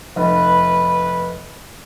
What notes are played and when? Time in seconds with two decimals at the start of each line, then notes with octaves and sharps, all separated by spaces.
0.16 F1 B4